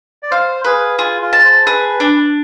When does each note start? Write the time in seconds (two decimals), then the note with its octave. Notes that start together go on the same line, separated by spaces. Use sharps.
0.23 D5
0.31 C5 F5
0.64 G#4 B4
0.99 F4 G#4
1.22 F4
1.33 A5
1.44 C5
1.66 G#4 B4
1.89 B4
2.00 D4